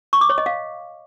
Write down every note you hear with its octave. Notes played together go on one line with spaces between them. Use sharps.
C#6
D6
C#5
D#5
F5